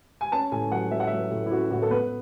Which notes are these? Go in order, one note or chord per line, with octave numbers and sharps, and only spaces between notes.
G#5
C#4 A5
A2 G#5
F#3 F#5
F#3 E5
F#5
F#3 E5
A2
E4
C#4 F#4
A2 F#4
A4
B3 B4